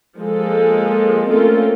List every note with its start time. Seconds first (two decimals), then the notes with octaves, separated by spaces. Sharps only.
0.17 F3 G#3 A#3 A4
1.28 A3 A#3 C4 C#4 F4 A4